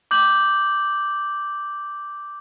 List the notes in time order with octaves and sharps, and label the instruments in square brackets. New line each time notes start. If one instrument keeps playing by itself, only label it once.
[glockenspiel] D6 G6 F#7